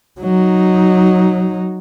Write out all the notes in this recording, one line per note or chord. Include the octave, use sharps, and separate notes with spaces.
F#3 D#4